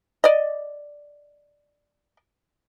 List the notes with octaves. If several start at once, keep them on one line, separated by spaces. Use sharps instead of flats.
D5 D#5